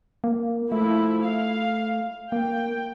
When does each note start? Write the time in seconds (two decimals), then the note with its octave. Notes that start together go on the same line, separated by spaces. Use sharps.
0.24 A#3
0.72 F3 A3 E4
1.25 F5
2.32 A#3 G5